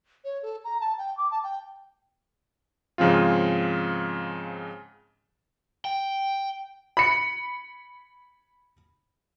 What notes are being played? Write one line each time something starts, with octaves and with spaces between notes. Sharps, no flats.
C#5
A4
A#5
A5
G5
D6
A5
G5
G#2 C#3 F3 C4 F4
G5
B5 C#7